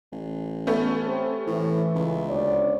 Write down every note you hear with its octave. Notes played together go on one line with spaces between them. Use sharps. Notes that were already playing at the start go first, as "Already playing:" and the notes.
A1
A3 B3 C#4
C4 G4
A2 E3
C#2
D2 C#5 D5